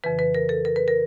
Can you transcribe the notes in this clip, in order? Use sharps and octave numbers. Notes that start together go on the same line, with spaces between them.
F2 C#3 E3 B4
B4
A#4
A4
A#4
B4
A#4